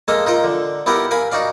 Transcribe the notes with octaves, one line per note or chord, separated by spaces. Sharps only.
G#3 A#3 A4 D#5 F5
D#4 F4 A#4 D#5
D3
B3 E4 G4 A#4 F#5
A#4 F5 G#5 B5
D#4 F#4 D5 F5